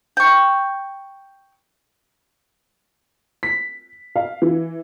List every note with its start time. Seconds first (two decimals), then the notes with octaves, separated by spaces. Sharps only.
0.17 G5 C#6
3.43 B6
4.16 F5
4.42 E3